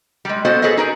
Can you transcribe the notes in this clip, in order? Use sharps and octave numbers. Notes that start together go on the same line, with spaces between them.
G3 G#3
B3 F#4 A4 C5 D#5
G#4 A4 B4 C#5 D#5
D#4 G#4 A#4